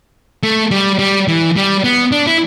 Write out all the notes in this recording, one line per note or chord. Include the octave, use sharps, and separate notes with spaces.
A3
G3
G3
E3
G3
B3
D4
E4